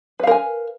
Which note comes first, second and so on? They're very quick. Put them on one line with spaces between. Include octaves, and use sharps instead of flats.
B4 F5 A#4 G#5